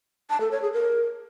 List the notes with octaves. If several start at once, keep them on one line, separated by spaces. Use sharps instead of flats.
A5
A4
C#5
G#4
A#4